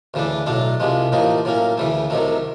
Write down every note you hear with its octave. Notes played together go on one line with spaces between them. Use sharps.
D2 C#3 E3 A3 D4
B1 A2 F#3 A3 D4
C2 C3 F3 G#3
A1 A2 F3 A#3 D#4
A2 F#3 A#3 C#4
D2 C#3 E3 A3
C2 C3 D#3 F#3 A3